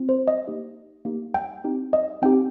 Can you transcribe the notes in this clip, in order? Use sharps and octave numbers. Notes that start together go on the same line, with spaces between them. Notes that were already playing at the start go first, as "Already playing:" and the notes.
Already playing: C4 F4
C5
D#5
A#3 D#4 G4
A#3 D#4 G4
G5
C4 D#4 G4
D#5
C4 D#4 G4 G5